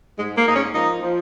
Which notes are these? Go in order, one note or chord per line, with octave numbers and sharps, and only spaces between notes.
G#2 G#3
A#3
G#2 D#4
G#3 C#4
F3 A#3 D#4
F3